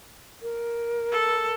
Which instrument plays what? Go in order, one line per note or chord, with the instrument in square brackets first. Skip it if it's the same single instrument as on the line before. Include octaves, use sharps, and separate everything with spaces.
[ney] A#4
[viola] A4